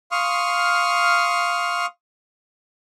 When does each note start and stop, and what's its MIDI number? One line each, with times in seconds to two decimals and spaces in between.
0.11 1.86 77
0.11 1.86 84
0.11 1.86 85
0.11 1.86 87
0.11 1.86 89